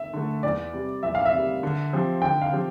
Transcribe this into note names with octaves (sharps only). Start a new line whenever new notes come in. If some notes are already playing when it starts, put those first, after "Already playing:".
Already playing: E5
D3 A3
E2 D5
C3 G3
E2 E5
F5
E5
C3 G3
D3
F3 C4 G4
D3 G5
F5
F3 C4 G4